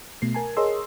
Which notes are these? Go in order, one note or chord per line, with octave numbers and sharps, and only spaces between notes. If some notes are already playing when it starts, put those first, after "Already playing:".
B2 A3 C7
A#4 G#5 A5
G#4 A#4 C#5 D#5 C6 E6